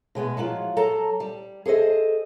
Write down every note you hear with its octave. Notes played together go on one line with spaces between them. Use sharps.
B2 G#3 B3
F3 F#3 G#3 F4
F#3 A4 A5 A#5
G3
G#4 A4 C5 D#5